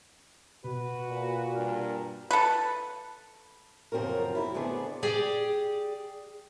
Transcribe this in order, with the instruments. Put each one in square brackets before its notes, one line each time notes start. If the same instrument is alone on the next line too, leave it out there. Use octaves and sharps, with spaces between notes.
[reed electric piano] B2 [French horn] F#4 [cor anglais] B4
[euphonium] A#2
[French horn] G2 [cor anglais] A#4
[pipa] A4 B4
[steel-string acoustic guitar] F#2 C#3 F3 C4 F#4 A#4
F#2 E4
D3 A3 B3 G#4 C5 D5
G4 G#4 D5 G5